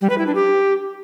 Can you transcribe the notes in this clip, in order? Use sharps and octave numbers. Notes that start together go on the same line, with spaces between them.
G3
B4
E4
D4
G4